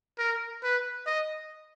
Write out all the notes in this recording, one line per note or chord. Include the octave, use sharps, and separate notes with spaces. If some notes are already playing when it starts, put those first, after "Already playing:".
A#4
B4
D#5